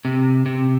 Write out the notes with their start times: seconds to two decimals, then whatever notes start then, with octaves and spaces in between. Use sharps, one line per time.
0.05 C3
0.46 C3